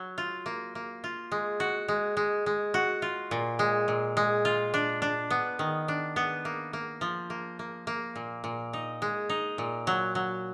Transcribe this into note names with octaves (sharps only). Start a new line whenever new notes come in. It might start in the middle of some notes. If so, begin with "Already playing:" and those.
Already playing: F#3
F4
A#3
A#3
F4
G#3
F#4
G#3
G#3
G#3
F#4
F4
A#2
G#3
A#2
G#3
F4
D4
D4
B3
D#3
D4
B3
A#3
A#3
F3
A#3
A#3
A#3
A#2
A#2
D#4
G#3
D#4
A#2
F#3
F#3